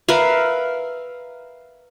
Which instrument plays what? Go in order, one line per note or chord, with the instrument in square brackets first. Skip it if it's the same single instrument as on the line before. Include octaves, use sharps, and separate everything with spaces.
[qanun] A#4 B4 E5 F5